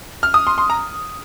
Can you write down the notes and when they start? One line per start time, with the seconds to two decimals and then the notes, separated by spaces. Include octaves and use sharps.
0.23 F6
0.34 D#6
0.47 C6
0.58 C6
0.70 A#5